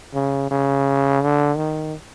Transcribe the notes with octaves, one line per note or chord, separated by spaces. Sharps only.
C#3
C#3
D3
D#3